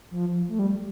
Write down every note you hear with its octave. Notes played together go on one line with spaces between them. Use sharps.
F3
A3
G3